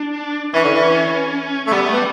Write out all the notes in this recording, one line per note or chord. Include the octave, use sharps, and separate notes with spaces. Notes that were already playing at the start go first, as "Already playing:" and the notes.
Already playing: D4
E3 C#4
D3
E3
A3
G3 B3
A3
B3
G3